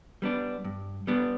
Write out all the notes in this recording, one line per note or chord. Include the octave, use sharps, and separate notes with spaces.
G3 B3 D4
G2
G3 B3 D4